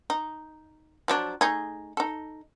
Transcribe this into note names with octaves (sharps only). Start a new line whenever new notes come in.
D#4
F3 F#3 D4
A3 D#4 G#4
D#4 A4